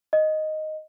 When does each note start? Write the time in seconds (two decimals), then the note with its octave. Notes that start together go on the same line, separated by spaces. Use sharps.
0.13 D#5